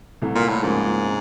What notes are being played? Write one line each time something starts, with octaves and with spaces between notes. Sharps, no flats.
C2 C3 E3 A3
A#2
A2
C#2 G#2 C#3 F3 A#3
C3